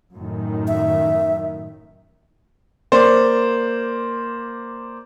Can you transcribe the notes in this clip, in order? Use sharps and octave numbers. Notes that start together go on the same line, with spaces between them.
F#2 A2 D#3
E5
A#3 C5 D5